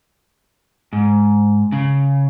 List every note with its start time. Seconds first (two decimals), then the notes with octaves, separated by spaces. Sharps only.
0.93 G#2
1.72 C#3